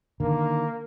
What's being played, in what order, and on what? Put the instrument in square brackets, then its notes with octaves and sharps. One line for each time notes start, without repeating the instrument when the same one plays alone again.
[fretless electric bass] D3 D#3 [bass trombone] A#3